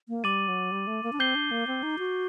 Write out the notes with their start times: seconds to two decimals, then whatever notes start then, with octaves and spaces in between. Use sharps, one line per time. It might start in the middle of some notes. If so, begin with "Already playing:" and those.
0.08 A#3
0.24 G3 D6 A6 D#7 F#7
0.48 F#3
0.72 G3
0.87 A3
1.03 A#3
1.13 D4
1.19 C4 G6 C7 G7
1.35 D4
1.51 A#3
1.67 C4
1.83 D#4
1.99 F#4